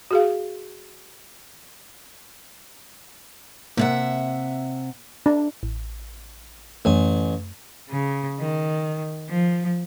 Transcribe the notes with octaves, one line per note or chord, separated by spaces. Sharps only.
F#4 G#4 F5
C3 A#3 E5 F#5
D4
A1
A1 F#2 A3 G#5
C#3
D#3
F3